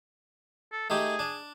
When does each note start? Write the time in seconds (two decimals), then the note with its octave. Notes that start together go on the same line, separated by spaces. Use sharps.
0.73 A4
0.90 A3 D#4 G4 G#4
1.19 D4